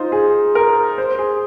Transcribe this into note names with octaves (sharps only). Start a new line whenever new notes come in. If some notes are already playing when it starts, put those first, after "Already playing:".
Already playing: D#4 F4 C5
G#4
A#4
C5
G#4